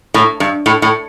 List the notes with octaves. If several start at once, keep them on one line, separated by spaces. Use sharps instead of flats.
A2
G2
A2
A2